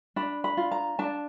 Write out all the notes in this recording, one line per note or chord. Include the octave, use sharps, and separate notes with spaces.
D4 B5
B5
F4
A#5
D4 A5